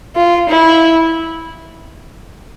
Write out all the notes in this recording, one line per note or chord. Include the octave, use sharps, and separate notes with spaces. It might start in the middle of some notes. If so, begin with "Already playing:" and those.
F4
E4